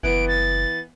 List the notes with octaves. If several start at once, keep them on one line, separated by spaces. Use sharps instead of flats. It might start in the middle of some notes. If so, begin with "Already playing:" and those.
F#1 E3 B3 D7
A6